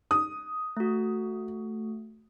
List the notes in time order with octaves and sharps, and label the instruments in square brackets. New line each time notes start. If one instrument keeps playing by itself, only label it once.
[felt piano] D#6
[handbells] A3 F#4